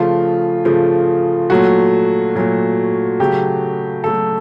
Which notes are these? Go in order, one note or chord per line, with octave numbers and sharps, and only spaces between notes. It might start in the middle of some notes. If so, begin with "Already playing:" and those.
Already playing: C#3 F3 A3 F4
C#3 F3 A3
A#2 F#3 A3 F#4
A#2 F#3 A3
C#3 F#3 A3 G4
C#3 F#3 A3 A4